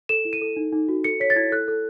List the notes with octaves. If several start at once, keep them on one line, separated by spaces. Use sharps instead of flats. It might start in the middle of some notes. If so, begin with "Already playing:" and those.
A4 E7
E4
D#7
A4
D#4
D#4
F#4
A4 C#7
C#5 B6
A6
E4 G#6
A4 F#6
A4